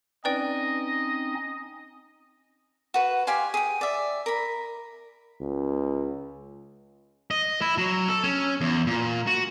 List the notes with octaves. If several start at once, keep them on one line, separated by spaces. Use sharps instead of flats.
C4 C#4 D#4 B4 D5 D#5 G5
F#4 B4
G4 F5 G#5 C6
G#4 G5
D5 E5
A#4 B5
C#2
D#5
E4
F#3
A4
C#4
E2
A#2
F#4